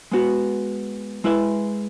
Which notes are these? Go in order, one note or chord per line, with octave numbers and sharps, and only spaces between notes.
G#3 B3 F#4
G#3 E4 B4 E5